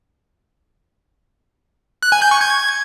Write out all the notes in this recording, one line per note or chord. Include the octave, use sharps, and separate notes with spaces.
F#6
G#5
G6
C#6
G#6